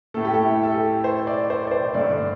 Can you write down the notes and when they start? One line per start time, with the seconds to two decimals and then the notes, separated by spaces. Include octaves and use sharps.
0.14 A2 A3 A4
0.25 G4
0.34 A4
0.45 E4
0.63 A4
0.74 G4
1.04 C5
1.27 D5
1.50 C5
1.67 D5
1.71 C5
1.94 G2 D3 A3 D5